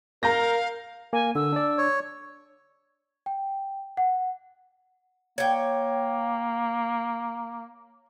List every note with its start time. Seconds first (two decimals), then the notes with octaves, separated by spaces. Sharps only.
0.23 A#4 F5 A#5 G6 A#6
1.13 A#3 G#5
1.35 D3 E6
1.52 D4 D5
1.78 C#5
3.26 G5
3.97 F#5
5.38 A#3 C#5 G5